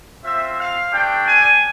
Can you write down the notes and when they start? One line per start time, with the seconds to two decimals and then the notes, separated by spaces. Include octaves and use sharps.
0.23 C4 F4 E5
0.57 F5
0.92 A3 D4 G4 G5
1.26 G#5